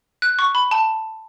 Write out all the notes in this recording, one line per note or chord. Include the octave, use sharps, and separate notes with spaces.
F#6
C#6
B5
A5